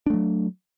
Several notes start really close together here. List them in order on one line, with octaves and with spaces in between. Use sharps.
D4 A3 F#3